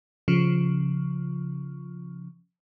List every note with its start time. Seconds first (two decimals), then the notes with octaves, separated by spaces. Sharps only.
0.28 C#3 F3